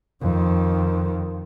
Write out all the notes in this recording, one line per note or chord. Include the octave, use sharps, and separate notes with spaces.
F2 D#3